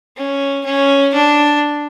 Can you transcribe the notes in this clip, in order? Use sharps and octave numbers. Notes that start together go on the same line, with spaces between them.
C#4
C#4
D4